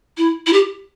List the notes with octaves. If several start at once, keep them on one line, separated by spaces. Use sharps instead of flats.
E4
E4
G4